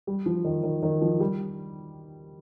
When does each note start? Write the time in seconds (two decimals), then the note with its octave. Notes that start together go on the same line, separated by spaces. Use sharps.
0.07 G3
0.26 F3
0.44 D#3
0.63 D#3
0.82 D#3
1.01 F3
1.20 G3